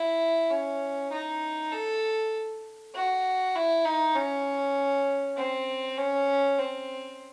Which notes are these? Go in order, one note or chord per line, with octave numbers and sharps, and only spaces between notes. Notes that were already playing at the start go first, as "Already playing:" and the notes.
Already playing: E4
C#4
D#4
A4
F#4
E4
D#4
C#4
C4
C#4
C4